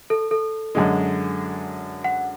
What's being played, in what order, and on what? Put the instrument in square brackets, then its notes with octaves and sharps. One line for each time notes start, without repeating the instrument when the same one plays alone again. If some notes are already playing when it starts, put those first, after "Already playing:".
[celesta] A4
A4
[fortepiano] F#2 D3 G#3
[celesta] F#5